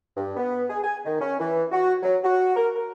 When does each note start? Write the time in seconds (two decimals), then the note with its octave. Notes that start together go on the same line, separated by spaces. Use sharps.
0.17 G2
0.37 B3
0.70 G#4
0.84 G#5
1.05 D#3
1.21 C#4
1.39 E3
1.72 F#4
2.03 F#3
2.24 F#4
2.56 A#4
2.75 A#4